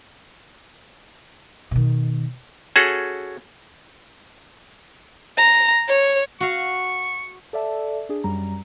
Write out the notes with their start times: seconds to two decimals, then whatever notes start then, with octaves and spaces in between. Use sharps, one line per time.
1.71 B2 D#3
2.76 C#4 F#4 G#4 A4
5.37 A#5
5.88 C#5
6.41 F#4 F5 C#6
7.53 A4 D5 E5 A5
8.09 D4 G#4
8.24 F#2 G3 A#5